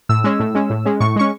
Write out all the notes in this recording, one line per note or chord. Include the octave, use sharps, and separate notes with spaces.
A2 E6
G#3 C#4
A2
G#3 C#4
A2
G#3 C#4
A2 C#6
G#3 C#4 C#6